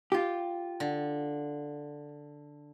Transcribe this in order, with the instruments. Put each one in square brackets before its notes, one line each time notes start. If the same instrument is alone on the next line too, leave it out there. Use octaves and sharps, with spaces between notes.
[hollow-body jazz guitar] F4 G4
[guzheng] D3